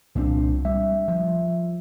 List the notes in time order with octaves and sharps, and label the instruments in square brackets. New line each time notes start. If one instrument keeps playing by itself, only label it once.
[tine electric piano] C2 D4 [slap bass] A#2 C4
[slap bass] G3 [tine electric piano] E5
[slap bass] F3